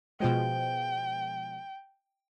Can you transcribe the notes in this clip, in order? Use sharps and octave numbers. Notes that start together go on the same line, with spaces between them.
B2 F3 G#3 G5